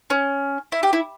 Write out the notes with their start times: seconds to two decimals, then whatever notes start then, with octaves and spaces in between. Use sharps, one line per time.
0.10 C#4
0.72 E4
0.83 G4
0.93 E4